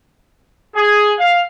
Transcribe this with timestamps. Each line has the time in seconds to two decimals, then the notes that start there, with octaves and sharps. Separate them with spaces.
0.76 G#4
1.19 F5